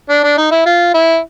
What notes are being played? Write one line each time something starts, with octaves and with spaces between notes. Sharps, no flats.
D4
D4
D#4
E4
F4
E4